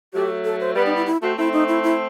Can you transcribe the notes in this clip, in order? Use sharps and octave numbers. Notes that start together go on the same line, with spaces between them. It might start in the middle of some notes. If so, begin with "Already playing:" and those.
F#3 A3 G4
A4
C5
G3 B3 B4
D#4
E4
E4
A3 C4 F#4
A3 C4 E4
D#4
E4
E4